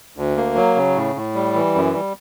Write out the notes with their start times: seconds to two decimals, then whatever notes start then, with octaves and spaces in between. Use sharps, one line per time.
0.16 D2
0.37 A#3
0.56 F#3
0.75 C#3
0.96 A2
1.16 A2
1.35 G3
1.55 E3
1.75 F#2
1.93 G3